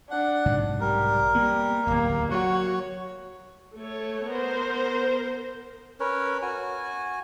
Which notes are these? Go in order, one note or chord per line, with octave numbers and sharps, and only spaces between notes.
D4 F#5
B1 G#2 C3
G3 A#4
G3 A#3 B3
D1 G#1 A#3
F#3 F#4 C#5
A3 A4 C#5
B3 A#4 C5
C#4 A#4 B4 C#5
F#4 G#5